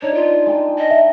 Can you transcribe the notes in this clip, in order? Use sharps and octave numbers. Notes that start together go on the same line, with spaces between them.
D4 D#4 C#5
F4
G#3 G5 A5
D#5
E5